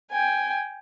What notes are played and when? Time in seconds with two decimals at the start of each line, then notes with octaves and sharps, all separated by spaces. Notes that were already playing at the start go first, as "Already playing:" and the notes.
0.12 G5 G#5